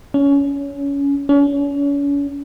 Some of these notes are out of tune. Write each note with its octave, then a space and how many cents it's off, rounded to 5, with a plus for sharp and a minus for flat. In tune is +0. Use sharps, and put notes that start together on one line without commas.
C#4 +20
C#4 +40